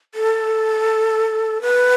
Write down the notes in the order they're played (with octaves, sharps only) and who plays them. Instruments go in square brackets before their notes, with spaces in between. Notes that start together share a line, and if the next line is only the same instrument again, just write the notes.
[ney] A4
B4